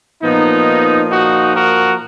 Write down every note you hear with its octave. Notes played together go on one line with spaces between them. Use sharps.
A#2 F3 B3 D#4
D#4 F#4
F#4 A#4